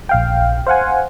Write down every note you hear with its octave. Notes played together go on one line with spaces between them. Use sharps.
A#1 F5 G5
C5 F5 F#5 G#5